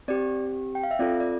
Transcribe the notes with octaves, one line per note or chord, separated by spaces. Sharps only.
C4 G4 D5
G5
F5
E5
C4 F4 A4 D5
D5